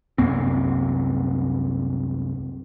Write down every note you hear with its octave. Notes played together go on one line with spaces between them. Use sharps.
C2 F#2 A#3 C4